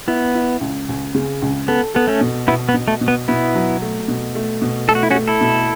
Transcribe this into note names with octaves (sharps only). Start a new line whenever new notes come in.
B3 E4
E4
C#2
C#2
C#3
C#2
B3 A4
B3 A4
A3 C#4
B2
B2 B3 E4
B3
B2
A3
B2
B3
B2 B3 E4
F#3
A3
B2
A3
B2
A3 A4
F#4
E4
C#4 F#4
A3
E4 A4
B2